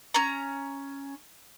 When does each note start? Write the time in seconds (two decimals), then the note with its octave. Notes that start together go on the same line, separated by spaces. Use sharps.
0.14 C#4 A#5